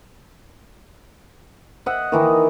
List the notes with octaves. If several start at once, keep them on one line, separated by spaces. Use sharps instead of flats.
D#5 E5 F#5
D#3 E3 D#4